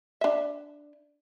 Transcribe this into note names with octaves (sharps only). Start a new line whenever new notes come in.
D4 E5